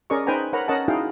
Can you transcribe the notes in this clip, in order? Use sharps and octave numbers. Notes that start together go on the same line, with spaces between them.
C#4 G#4 A#4 D5 D#5 C#6
D#4 B4 C5 G5 G#5 A#5
A#4 B4 C#5 F#5 A#5
C#4 A#4 C#5 D#5 F#5 A5
D#4 E4 F#4 G#4 F5 G5